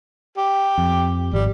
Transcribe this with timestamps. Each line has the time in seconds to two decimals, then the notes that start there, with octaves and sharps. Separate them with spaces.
0.37 G4
0.78 F2
1.33 G#1 G3